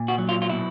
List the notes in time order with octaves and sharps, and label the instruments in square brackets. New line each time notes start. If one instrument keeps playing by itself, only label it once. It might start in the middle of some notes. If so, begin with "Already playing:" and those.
Already playing: [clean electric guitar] A#2
F#4
F#3
F4
F4
B2 E4